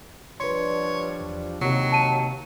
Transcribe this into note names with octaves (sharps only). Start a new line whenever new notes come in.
F3 G3 D4 B4 C#5 C6
E2
D#2 C3 F#3
A5 D#7